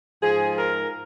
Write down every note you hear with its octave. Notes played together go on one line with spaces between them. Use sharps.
G#2 F3 G#4
A#4